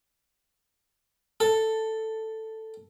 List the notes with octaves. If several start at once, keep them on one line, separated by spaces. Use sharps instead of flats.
A4